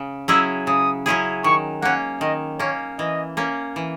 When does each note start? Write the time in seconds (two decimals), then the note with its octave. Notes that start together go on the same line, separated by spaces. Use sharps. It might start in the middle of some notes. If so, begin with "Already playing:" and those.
Already playing: C#3
0.28 F#3 C#4 E4 G#4 E6
0.67 C#3 D#6
1.06 F#3 C#4 E4 G#4
1.44 D#3 C#6
1.82 A#3 C#4 F#5
2.21 D#3 D#5
2.59 A#3 C#4 C#5
2.99 E3 D#5
3.37 A#3 C#4
3.76 E3